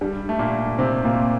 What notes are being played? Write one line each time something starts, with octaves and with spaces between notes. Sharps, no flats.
G2 G3
A3
A#2 A#3
C3 C4
A#2 A#3